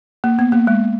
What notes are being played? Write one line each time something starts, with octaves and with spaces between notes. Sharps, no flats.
A#3
B3
A#3
G#3